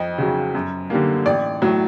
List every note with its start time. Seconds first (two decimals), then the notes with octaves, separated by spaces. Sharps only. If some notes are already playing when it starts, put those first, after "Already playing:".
Already playing: F2 D#5
0.18 C#3 F#3
0.55 F#2
0.90 D3 G3 A#3
1.26 A1 D5
1.62 A2 F#3